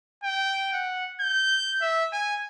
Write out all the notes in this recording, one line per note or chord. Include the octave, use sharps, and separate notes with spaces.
G5
F#5
G6
E5
G#5